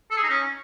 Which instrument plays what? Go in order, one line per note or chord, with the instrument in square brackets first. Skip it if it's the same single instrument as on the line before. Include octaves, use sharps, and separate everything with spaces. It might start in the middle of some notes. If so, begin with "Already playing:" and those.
[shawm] A4
G#4
D#4
C#4